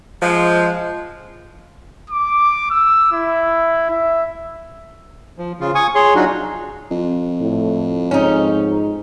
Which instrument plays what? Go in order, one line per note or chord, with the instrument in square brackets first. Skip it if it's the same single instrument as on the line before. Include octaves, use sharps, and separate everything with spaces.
[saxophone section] F3 G#3
[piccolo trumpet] D6
E6
E4
E5
[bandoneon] F3
C#3 F4
G#5 C#6 D#6
G#4 C#5 C6
F#3 D4 D#4 F4 F#4
[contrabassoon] F2
[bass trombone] A2
[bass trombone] G#2 [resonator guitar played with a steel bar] C#4 D#4